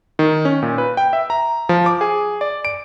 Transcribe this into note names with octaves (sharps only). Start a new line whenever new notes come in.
D#3
C#4
A#2
B4
G5
E5
A#5
F3
D6
G#4
D5
D7